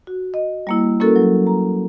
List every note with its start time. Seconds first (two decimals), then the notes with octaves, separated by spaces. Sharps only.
0.07 F#4
0.34 D#5
0.67 G3 A#3 E4
1.00 A#3 C#4 E4 F#4 A4 A#4
1.16 F#3
1.47 A#5